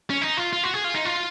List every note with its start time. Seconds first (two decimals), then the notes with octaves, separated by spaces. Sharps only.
0.10 C#4
0.22 D#4
0.37 F4
0.53 F4
0.63 F#4
0.74 G#4
0.84 F4
0.95 D#4
1.05 F4